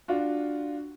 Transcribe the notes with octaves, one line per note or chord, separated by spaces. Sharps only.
D4 F4 F#4